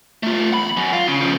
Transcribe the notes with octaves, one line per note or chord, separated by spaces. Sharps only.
A3 F4
E2 B5
F#2
F4
C#3
C#3 F3